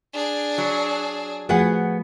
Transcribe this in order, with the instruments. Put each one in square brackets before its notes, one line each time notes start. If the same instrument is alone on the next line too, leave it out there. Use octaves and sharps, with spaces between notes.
[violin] D4 G#4
[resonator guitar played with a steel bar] F#3
[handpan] F3 A3 F#4 [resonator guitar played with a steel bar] B3 G#4 F#5